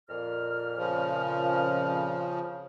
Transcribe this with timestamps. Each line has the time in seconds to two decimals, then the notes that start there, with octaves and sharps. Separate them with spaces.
0.09 F2 A#2 F6
0.77 C#3 F3